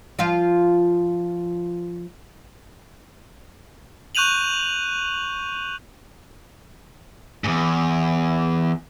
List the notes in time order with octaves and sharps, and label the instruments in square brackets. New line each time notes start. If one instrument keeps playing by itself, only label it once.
[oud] F3 F4 F5
[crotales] C#6 F#6 G6 D#7 F7 F#7
[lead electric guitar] E2 G#2